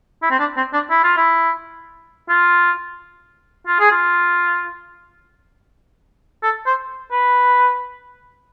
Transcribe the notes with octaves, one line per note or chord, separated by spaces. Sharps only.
E4
C4
D4
C4
D4
E4
F4
E4
F4
F4
G#4
F4
A4
C5
B4